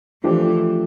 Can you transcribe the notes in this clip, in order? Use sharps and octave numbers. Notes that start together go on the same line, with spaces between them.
E3 F3 A3 D4 G4 C5